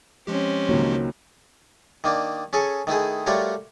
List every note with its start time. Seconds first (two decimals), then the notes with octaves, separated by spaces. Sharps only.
0.27 F3 G#3 C4 C#4 G4
0.69 C#2 D#3 F#3 A#3
2.04 D#3 A#3 D4
2.53 C#4 G#4 A4 C#6
2.87 D#3 A3 E4 G#4
3.27 G3 A3 F4 F#4 A#4 C#5